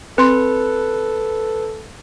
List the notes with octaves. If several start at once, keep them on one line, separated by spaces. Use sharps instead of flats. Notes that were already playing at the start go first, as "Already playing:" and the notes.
C4 A4 B4 C6